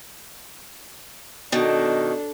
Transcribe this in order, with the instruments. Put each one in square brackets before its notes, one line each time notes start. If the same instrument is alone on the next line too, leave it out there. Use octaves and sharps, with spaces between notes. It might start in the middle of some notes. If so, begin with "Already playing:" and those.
[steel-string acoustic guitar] B2 D#3 [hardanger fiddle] D4 A4